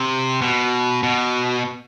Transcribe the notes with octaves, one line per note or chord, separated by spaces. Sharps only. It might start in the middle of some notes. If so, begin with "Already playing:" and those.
Already playing: C3
B2
B2